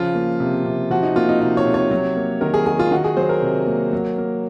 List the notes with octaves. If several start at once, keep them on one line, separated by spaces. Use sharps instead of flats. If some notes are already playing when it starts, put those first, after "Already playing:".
Already playing: C#3 F3 F4
A#3
C3
C3
F3 F#4
D#4
A#3 F4
D#4
C3 D#4
C#5
C3
C#5
F#3
A#3
D#3 A#4
G#4
D#3 G#4
F4
D#3 F#4
G#4
F#3 C5
A#4
C3
A#3
F#3
A#3